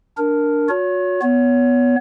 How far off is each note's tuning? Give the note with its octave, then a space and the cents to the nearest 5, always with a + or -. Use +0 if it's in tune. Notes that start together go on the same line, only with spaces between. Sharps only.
D4 +0 A#4 +0
F#4 -35 C#5 +25
B3 +0 C#5 +25